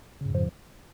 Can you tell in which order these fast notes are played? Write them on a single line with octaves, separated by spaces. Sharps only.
C#3 G#2 F2 F3